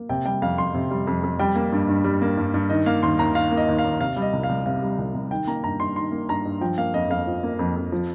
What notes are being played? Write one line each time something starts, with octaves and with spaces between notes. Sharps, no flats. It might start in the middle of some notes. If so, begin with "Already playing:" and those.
Already playing: A#3
C3 G5
G3 G5
F2 F5
F2 C6
C3
G3
F2
F2
G3 G5
A#3
G2
G2
G3
A#3
G2
G2
D#3 D#5
A#3 F5
D#2 C6
D#2 A#5
D#3 F5
A#3
D#5
D#2
F5
D#2
C3 F5
G3
D#5
C2
F5
C2
C3 F5
G3
C2
C2
D#3 G5
A#3 A#5
G2 A#5
G2 C6
D#3 C6
A#3
G2 A#5
G2
F3 G5
A#3 F5
F2 D#5
F2 F5
F3
A#3
F2
F2
F3